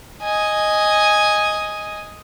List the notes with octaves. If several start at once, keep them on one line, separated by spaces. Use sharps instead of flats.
D#5 G#5